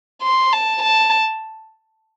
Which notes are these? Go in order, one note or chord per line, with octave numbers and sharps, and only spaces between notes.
C6
A5
A5